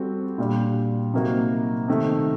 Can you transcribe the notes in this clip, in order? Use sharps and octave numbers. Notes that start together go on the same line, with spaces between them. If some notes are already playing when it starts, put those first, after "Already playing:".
Already playing: G3 C4 F#4 A4
A#2 G3 D4
C3 F#3 A#3 D#4 F#4
C3 D#3 A3